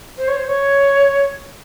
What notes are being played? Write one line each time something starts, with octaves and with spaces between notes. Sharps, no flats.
C5
C#5
C5
C#5